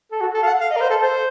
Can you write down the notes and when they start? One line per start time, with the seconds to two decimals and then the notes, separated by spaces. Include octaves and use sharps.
0.12 A4
0.21 F#4
0.34 A4
0.43 F5
0.47 F#5
0.61 F5
0.71 D#5
0.77 A#4
0.81 C5
0.90 A4
1.01 C5